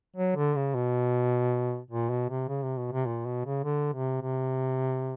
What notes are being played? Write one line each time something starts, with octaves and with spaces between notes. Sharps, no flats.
F#3
D3
C#3
B2
A#2
B2
C3
C#3
C3
B2
C3
A#2
B2
C#3
D3
C3
C3